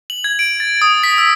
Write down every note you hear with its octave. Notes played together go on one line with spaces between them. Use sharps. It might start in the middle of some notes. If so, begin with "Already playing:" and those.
F#7
G#6
D7
A6
D#6
B6
E6